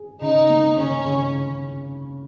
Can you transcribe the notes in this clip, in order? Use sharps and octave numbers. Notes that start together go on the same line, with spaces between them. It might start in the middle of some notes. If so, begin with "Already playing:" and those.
Already playing: G#4
C#3 D#4
A#3
C#3 C#4
C#3